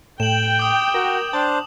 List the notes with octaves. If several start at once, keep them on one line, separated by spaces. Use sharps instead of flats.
A2 G5 E7 F#7
D6 D#6
F#4 A#4
D4 C5 A5